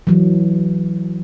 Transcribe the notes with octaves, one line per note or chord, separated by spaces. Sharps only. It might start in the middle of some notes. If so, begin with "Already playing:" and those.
E3 F#3